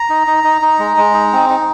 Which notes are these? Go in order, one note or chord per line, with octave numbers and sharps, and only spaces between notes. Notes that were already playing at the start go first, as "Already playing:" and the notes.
Already playing: A#5
D#4
D#4
D#4
D#4
G#3
G#3
D#4
C4
D#4